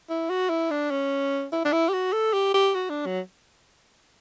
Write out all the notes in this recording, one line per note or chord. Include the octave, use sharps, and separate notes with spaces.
E4
F#4
E4
D4
C#4
E4
D4
E4
G4
F#4
A4
G4
G4
F#4
D4
F#3